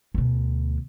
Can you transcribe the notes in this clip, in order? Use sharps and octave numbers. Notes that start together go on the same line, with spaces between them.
D2 B2